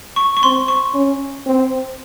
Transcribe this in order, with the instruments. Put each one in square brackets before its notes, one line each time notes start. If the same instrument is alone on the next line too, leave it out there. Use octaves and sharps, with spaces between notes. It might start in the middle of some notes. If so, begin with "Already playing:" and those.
[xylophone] C#6
C#6
[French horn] C4 [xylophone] C6
[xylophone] C#6
[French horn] C#4
C4